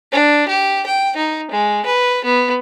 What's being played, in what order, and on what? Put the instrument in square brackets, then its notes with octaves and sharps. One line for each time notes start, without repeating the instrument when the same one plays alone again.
[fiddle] D4
G4
G5
D#4
G#3
B4
B3